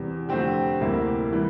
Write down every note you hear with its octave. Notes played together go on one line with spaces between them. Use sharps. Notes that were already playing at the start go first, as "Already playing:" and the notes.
Already playing: E2 C3 G3
F2 D3 A3 C4 G4
D2 C3 G3 A#3 E4
E3 G3